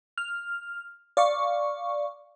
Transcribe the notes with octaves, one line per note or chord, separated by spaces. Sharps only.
F6
D5 F5 C#6